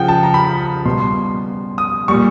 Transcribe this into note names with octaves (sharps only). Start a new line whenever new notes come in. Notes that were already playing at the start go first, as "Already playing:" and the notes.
Already playing: C#3 F3 F#5 G5
A5
A#5
B5
B5
B2 G3 C6
C6
D#6
A#2 G3 C#6